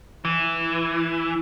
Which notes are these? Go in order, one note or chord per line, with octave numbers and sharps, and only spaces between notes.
E3